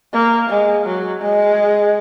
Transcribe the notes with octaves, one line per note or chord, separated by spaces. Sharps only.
A#3
G#3
F#3
G#3